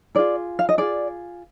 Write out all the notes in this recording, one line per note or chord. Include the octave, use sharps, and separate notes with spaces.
F4 G#4 D5
F5
D#5
F4 G#4 D5